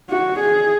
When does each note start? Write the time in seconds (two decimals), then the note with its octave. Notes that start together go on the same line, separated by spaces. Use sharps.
0.10 F#4
0.39 G#4